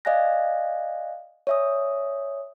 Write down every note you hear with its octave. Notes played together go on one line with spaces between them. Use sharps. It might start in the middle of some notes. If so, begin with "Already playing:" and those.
D5 D#5 F5 G#5 F#6 A#6
C#5 D5 E5 G#5 D#6